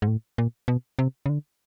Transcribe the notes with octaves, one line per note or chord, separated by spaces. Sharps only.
G#2
A2
A#2
B2
C3
C#3
D3